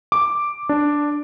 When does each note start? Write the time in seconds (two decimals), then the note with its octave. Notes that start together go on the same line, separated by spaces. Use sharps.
0.12 D6
0.69 D4